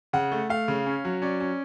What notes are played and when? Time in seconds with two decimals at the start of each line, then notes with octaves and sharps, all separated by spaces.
0.13 C#3 F#5
0.32 A3
0.49 A3 F5
0.68 C#3
0.86 C#4
1.05 F#3
1.22 C#4 D5
1.40 C#4